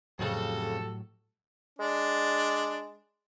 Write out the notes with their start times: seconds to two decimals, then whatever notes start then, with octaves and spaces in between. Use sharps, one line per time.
0.19 F2 A2 C#3 F#3 F#4 G4 A4
1.79 G#3 D4 D5